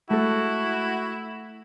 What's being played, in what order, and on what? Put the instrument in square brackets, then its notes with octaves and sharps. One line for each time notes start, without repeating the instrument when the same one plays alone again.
[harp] A3 A4 [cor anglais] E4 [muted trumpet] F#4